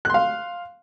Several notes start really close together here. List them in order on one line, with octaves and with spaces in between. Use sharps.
F#6 C6 F5